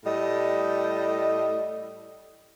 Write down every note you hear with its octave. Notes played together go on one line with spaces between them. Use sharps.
A2 G3 D#5